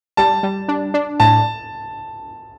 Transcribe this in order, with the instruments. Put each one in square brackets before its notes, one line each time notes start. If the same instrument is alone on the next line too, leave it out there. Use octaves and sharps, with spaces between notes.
[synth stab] G3 [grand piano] A5
[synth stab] G3
D4
D4
[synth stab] A2 [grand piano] A5